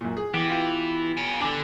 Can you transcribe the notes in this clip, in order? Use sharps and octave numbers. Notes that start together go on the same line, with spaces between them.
F#2 A#2
G#4
E3 B3 G4
F4 G5
F5 G#5
D4 A4 G#5 D6